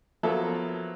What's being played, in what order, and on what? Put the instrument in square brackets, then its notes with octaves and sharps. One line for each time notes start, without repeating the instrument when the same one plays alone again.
[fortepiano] F3 F#3 A#3 B3 A4 E5